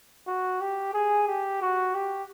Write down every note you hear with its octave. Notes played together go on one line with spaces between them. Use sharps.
F#4
G4
G#4
G4
F#4
G4